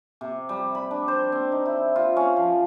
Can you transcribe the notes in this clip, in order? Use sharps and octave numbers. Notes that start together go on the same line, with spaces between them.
C3
G3
B5
D4
C5
C4
D#4
E4
F4
C#4
F3